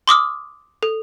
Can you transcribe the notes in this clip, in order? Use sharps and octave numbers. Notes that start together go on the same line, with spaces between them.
C6 D6 D#6 F6
A4